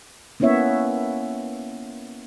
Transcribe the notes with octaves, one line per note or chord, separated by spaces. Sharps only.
A#3 B3 C#4 E4 C#5 E5